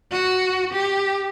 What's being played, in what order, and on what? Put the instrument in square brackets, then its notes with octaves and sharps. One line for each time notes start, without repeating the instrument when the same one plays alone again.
[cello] F#4
G4